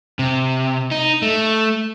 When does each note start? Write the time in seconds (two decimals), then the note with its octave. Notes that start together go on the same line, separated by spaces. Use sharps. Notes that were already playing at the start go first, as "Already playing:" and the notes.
0.19 C3
0.91 D#4
1.22 A3